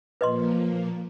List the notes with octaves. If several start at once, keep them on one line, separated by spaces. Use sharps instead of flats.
A#2 F3 A#3 B4 D#5 C6